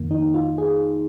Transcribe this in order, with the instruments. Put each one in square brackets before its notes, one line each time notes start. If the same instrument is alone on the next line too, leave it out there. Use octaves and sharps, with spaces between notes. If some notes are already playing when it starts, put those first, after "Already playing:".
Already playing: [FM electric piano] F2 D#3 A#3
D#4
F4
G#4